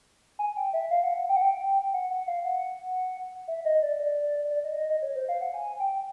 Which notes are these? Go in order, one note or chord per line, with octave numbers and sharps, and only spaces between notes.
G#5
G5
E5
F5
F#5
F#5
G5
F#5
G5
F#5
F#5
F5
F#5
E5
D#5
D5
D5
D5
D#5
D#5
D#5
C#5
C5
F5
F#5
G#5
G5